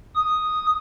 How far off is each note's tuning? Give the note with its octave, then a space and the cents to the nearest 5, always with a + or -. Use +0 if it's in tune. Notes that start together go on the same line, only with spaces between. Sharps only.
D#6 +0